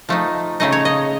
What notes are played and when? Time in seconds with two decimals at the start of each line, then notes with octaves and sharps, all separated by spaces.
0.09 F3 A3 D#4
0.60 C#3 A3 D#4 D#5
0.72 C#5
0.85 D#5